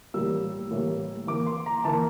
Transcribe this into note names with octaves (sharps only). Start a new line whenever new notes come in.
A2 E3 G3 A#3 E6
A2 E3 G3 A#3
E3 A#3 D6
C6
A#5
E3 A#3 A5